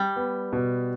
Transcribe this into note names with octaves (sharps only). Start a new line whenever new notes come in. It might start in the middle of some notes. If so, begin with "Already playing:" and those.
Already playing: G3
B3
B2